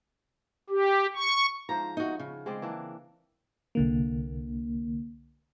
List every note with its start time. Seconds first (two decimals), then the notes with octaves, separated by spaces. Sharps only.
0.70 G4
1.15 C#6
1.69 G#2 F3 C5 A#5
1.97 D#4 F#4
2.19 C#3
2.46 G#3 C4 D5
2.62 E3 A#3 D4
3.75 C2 D3 A#3